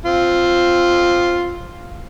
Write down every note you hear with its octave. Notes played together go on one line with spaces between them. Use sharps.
C4 F4